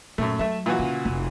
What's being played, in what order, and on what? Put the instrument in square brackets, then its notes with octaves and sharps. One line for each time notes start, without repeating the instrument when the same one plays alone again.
[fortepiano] F#2 A3 [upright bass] A#2
[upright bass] F#3 [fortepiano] A3 E5
[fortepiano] A#2 E3 F#4
[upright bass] C#3
F1